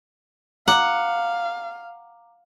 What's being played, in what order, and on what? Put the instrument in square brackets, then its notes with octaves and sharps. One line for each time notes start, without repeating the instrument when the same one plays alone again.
[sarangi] F5 [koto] F#5 [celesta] A#5 D6